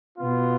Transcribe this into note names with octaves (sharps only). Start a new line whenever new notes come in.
B2 B3 F4